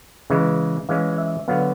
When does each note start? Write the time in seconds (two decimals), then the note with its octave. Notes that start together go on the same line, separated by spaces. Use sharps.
0.30 C#3 E3 G#3
0.89 E3 G#3 C#4 F5
1.18 E5
1.48 D3 F#3 B3 F5